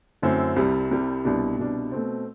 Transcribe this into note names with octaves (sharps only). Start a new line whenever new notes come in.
F#2 D3 A3 C4 E4
C2 C3 G3
C2 C3 G3
C2 B2 G3 D4
C2 B2 G3 D4
B2 A3 C4